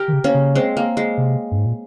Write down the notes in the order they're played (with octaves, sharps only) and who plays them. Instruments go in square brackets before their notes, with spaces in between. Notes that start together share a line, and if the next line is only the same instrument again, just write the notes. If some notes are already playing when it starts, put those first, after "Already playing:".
Already playing: [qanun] G4 A#4
[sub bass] D#3
C#3
[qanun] A#3 C#4
[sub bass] C#3
[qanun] G#3 C4
A#3
G#3
[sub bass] C3
G2
G#2
A#2